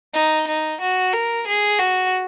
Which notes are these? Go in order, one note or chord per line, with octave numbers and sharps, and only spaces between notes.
D#4
D#4
F#4
A#4
G#4
F#4